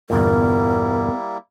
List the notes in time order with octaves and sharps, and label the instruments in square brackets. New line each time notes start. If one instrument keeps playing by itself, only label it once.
[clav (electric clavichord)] G1 E2 A#2 [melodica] G3 A#3 E4 [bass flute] B3 [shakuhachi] A#4